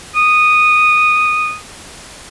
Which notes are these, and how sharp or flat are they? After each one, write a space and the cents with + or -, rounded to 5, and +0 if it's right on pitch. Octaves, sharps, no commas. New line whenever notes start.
D#6 -10